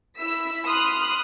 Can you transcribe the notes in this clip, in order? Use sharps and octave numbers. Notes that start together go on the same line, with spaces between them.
E4 E6 B6
B5 C6 D#6 F6 F#6